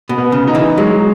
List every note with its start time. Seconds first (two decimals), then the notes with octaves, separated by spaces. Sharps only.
0.09 B2
0.18 B3
0.32 C#3
0.47 D#4
0.55 E3
0.78 F#3 G#3